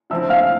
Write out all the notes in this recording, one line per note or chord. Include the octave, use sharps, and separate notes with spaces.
D3 F3 C4 E4 E5 E6
F5 F6